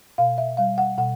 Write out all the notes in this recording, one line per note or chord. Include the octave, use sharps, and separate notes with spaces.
B2 F5
E5
G3 F5
F#5
B2 F#5